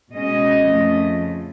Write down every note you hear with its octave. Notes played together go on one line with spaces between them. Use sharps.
B2 G#3 C#4 D#5
F2 C#3 F3 A3